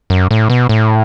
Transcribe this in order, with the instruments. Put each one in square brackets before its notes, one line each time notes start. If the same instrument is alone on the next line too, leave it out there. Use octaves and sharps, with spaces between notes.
[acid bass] F#2
A2
B2
A2